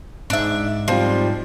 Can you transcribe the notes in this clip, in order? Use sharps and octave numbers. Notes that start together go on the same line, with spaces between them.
G#2 D4 E5
F3 G3 C4 F4